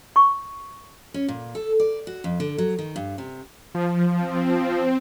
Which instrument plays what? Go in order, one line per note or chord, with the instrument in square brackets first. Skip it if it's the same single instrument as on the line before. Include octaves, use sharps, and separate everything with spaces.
[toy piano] C#6
[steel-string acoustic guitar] C#4
A#2
A4
D5
F#4
F2
D3
F#3
D#3
G2
C3
[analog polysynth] F3
[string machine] C4